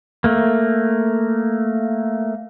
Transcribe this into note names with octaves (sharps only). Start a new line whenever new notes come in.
A3 A#3